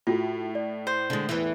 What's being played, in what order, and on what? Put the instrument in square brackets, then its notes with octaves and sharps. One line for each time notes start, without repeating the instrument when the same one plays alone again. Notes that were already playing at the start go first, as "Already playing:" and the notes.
[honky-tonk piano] A2 [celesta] F4 F#4
[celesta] D5
[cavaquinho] C5
[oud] D3 G#3
E2 E3